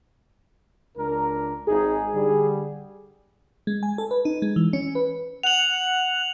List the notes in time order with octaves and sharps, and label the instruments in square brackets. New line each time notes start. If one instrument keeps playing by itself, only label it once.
[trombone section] C#2 D4 A#4
[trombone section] G#1 D#4 [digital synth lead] G#4
[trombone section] D3 G3
[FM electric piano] G#3
G#5
A4
B4
D#4
G#3
E3
C#4
B4
[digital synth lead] F#5 [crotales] F7 F#7